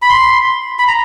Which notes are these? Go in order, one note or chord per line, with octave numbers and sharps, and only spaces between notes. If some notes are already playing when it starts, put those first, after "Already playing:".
B5
C6
B5
A#5